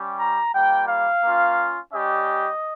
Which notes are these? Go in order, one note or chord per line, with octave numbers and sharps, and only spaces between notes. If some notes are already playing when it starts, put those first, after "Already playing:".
Already playing: G3 C#4 G4
A#5
G3 A#3 F4 G5
F5
A#3 C#4 F4
G3 C#4 G4 D#5